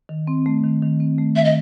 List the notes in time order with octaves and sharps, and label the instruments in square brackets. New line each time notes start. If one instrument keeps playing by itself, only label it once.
[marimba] D#3
C4
A3
D#3
D#3
C4
A3
[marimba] D#3 [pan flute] E5
[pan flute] D#5